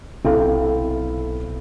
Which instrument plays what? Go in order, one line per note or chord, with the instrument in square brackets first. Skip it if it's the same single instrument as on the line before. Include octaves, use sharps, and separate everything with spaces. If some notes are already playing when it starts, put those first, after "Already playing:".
[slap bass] B1 C3 C4 [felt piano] E4 A4 F5